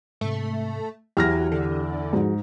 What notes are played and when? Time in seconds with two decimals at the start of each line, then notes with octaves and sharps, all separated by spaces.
0.21 G#2 C3 A3
1.17 E2 F#3 G4 F6 A#6
1.52 D3
2.13 G#2 F3 F#4 G#4